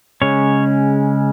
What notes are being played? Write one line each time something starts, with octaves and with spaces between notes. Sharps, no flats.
C#3 G#3 C#4 C#5